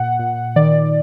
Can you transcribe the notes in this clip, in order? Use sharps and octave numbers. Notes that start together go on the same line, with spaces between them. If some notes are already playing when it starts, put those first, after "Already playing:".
Already playing: A#2 F#5
A#2
D#3 D5